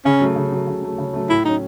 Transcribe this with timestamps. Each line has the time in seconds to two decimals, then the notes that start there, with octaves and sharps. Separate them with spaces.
0.05 C#3 C#4
0.20 F#3 A3
0.36 C#3
0.52 F#3 A3
0.67 C#3
0.82 F#3 A3
0.98 C#3
1.13 F#3 A3
1.30 A2 E4
1.45 F#3 C#4 D#4